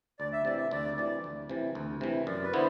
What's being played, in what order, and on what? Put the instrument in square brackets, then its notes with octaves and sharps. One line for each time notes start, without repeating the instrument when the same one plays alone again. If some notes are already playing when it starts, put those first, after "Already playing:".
[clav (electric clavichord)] D2 [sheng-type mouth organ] D5
[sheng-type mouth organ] E5
[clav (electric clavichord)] C3 E3 [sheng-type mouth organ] D5
[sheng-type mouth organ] E5
[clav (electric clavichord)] D2 [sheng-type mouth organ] D5
[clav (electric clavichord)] C3 E3 [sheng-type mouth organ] D5
[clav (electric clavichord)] D2
C3 E3
D2
C3 E3
[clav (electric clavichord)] F#2 [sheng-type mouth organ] D5
[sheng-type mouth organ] B4
[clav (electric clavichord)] D3 B3 E4 [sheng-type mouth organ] C5